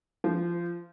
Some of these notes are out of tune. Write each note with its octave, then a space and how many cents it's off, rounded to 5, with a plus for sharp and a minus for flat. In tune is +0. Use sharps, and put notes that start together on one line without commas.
F3 -20